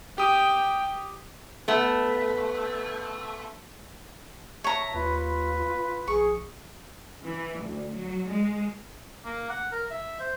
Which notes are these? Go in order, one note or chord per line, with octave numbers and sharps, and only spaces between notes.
G4 G5 D#6
A3 B3
C#5 E5 A5 A#5
D#2 F4 B4
B4
A#1 G#4 C#6
E3
D2
F#3
G#3
A#3
F#5
A#4
E5
C5